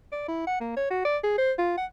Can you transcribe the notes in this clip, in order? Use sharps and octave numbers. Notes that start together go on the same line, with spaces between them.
D5
E4
F#5
A#3
C#5
F#4
D5
G#4
C5
F4
F#5